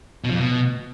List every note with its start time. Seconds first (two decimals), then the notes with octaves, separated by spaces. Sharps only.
0.24 B2
0.29 F3
0.34 F2
0.39 B2